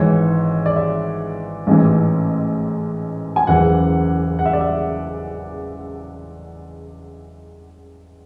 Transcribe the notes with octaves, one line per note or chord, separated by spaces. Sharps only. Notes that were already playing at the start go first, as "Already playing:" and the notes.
Already playing: G#1 G#2 E3 C#5
D5
E5
A1 G#2 E3
G#5
F#1 E2 C#3 E3 F#5
F#5
E5
D5
E5